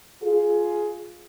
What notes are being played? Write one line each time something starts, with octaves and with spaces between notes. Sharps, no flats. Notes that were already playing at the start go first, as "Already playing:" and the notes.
F4 G#4